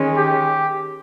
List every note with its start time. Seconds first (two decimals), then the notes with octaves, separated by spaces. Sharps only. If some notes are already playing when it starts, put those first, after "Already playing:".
Already playing: D#3 G#3 C#4
0.17 G4